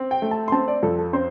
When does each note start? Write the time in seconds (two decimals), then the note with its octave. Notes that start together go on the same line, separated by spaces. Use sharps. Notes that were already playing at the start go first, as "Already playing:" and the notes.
Already playing: C4
0.11 G5
0.22 A3
0.31 A5
0.48 C6
0.52 C4 A5
0.68 D5
0.83 F2 A4
0.99 A4
1.13 C4 C5